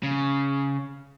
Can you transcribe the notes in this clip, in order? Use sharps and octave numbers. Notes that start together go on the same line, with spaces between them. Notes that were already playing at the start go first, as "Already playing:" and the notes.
C#3